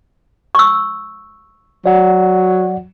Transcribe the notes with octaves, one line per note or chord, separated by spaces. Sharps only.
C#6 E6
F#3 D5 F#5